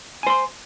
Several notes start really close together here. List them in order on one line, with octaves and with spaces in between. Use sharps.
G#5 C5 C6